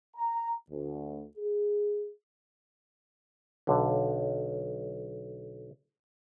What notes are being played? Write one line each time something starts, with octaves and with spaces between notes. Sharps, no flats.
A#5
D2
G#4
B1 D3